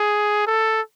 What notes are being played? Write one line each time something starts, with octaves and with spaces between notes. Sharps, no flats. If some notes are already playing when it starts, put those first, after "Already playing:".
Already playing: G#4
A4